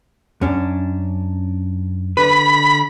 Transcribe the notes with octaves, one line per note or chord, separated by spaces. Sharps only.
F#2 C#4 D4
D3 B4 B5